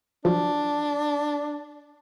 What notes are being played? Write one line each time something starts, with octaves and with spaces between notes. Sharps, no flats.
F3 F#3 D4